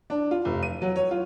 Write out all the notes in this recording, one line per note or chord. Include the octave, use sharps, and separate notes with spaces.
D4
F4
F1
D#7
F#3
C#5
F4